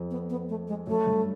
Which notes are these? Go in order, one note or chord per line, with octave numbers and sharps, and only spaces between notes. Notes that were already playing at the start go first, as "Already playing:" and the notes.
Already playing: F2
B3
B3
A3
G#3
F#2 A3
G2